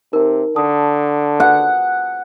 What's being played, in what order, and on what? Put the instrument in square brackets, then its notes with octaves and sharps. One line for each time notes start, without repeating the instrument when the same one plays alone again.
[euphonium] C3 [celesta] D#4 A#4
[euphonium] D3 [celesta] A5 D#6
[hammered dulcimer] F#5